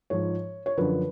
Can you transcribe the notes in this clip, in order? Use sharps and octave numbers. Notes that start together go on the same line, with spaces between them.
G#2 F3 C#5
C#5
F#2 D3 F3 B4